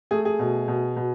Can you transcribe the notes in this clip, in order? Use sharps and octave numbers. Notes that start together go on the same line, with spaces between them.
A3 G#4
G#4
B2
B2
B2